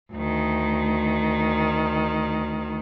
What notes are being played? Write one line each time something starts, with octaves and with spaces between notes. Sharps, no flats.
D2 D#3